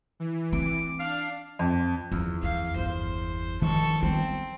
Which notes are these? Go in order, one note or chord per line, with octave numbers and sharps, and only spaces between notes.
E3
C4 D6
D4 F5
F2
E2 F3
F2 F5
G1 C5
D#3 F3 G#3 A4 C#6
G3 B3 C4